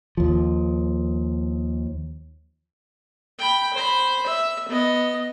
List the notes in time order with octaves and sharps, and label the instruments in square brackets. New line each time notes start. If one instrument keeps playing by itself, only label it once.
[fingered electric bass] D#2 F3
[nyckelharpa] G5 B5
C5 B5
E5
B3 D#5